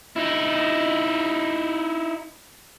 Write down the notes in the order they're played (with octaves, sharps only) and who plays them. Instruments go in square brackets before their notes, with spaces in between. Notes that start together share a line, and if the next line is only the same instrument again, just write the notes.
[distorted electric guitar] D#4 E4